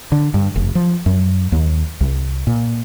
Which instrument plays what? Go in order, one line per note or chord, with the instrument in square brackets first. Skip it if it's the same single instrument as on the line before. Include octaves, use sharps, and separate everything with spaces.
[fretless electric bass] D3
G2
F1
F3
F#2
D#2
C2
A#2